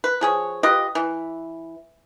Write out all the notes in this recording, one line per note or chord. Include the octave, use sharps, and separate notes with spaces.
B4
F3 G#4 C#5
F4 G4 B4 D#5
E3